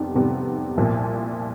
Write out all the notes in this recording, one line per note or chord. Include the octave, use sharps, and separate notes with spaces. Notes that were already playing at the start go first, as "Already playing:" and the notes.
Already playing: F2 C3 D#3 G3 B3
F2 C3 D#3 G3 B3
C2 A#2 F3